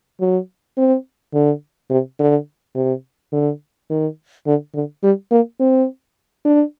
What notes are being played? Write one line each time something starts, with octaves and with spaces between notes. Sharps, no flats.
F#3
C4
D3
C3
D3
C3
D3
D#3
D3
D3
G3
A#3
C4
D4